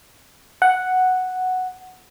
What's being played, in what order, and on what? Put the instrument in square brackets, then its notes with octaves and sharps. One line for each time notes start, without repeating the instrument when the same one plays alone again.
[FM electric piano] F#5